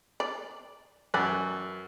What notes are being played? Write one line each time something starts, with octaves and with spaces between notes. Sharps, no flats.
D5
F#2 B4 D5 G#5